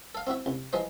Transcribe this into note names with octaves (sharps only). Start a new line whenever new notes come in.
A4 F5
C4 E4 F#4 E5
C2
E3 F3 G#3 B4 C5